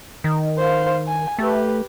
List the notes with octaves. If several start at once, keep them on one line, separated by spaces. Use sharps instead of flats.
D#3
C5 F5
G#5
A3 G4 B4